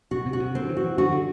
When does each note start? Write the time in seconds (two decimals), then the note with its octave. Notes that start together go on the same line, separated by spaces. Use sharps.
0.11 B2 F#4
0.26 C3
0.33 F#4
0.40 C3
0.55 D3 C4
0.69 E3
0.77 F#4
0.84 E3
0.98 D3 F#4
1.13 D3